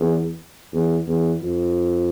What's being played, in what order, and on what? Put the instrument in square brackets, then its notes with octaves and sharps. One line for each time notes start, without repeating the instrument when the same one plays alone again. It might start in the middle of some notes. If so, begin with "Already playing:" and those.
Already playing: [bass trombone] E2
E2
E2
F2